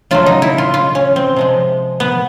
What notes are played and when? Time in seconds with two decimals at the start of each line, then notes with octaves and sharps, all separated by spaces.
0.11 C#3 F#3 A3 F4
0.26 D#4
0.42 E4
0.58 F4
0.74 F4
0.95 C#4
1.16 C4
1.37 C3 F3 G#3
2.00 B3